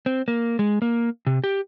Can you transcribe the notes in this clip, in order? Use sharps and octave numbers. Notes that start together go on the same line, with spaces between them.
C4
A#3
G#3
A#3
C3
G4